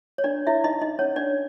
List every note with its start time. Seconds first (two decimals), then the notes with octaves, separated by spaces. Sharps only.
0.18 C#5
0.24 D4 D5
0.47 E4 E5
0.64 D#4 D#5
0.81 D#4 D#5
0.99 C#4 C#5
1.16 D4 D5